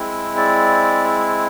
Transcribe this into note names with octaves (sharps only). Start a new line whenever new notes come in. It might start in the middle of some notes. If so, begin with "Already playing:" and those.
Already playing: G#3 C4 E4
D5